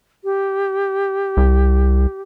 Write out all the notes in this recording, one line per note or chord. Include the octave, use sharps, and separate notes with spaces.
G4
C2